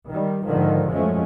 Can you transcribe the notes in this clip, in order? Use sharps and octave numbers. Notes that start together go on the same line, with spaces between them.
D#3 G3
G#2 D3 D#3 F3
F#2 F3 G#3 A3 C#4